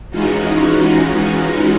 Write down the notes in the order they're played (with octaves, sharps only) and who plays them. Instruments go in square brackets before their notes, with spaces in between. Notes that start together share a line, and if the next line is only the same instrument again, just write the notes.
[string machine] E3 G#3 C#4 D#4 F4 F#4